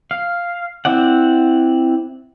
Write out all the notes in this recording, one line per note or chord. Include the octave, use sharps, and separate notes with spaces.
F5
C4 E4 D5 F#5